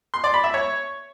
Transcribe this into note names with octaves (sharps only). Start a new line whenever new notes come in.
C6
D5
B5
E5
C#5